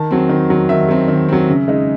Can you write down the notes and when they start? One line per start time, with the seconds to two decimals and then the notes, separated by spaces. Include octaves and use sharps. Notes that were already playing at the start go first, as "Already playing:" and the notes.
Already playing: D#3 A5
0.11 F#3 C4
0.29 D#3
0.50 F#3 C4
0.69 D#3 E5
0.89 F#3 C4
1.08 D#3
1.29 F#3 C4
1.49 C#3
1.68 G#3 D#4